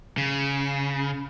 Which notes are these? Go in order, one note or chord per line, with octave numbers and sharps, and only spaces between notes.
C#3